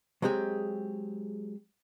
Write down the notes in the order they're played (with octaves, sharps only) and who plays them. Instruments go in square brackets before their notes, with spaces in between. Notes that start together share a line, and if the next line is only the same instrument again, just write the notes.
[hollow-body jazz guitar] F#3 G#3 C4 G4 G#4